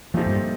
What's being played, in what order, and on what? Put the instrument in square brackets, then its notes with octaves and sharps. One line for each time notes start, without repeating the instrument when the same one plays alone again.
[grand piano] A#2 A3 C4 D#4 G4 [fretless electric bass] F3
[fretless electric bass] G2